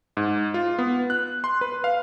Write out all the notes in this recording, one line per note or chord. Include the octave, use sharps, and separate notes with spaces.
G#2
F4
B3
F#6
C6
B4
F5